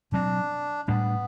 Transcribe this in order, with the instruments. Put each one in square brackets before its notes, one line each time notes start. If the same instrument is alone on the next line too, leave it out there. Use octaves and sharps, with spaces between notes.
[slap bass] B2 F#3 C4 [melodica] D4
[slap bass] A2 G3 D4 [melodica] B3